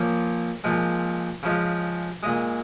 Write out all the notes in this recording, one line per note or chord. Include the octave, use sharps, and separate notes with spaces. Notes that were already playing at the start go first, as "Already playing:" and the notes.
Already playing: A#2 F3 A#3 C#5
A#2 F3 G#3
C#3 F3 G#3
A#2 G#3 D#5